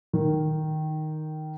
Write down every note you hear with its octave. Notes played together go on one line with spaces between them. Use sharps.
D#3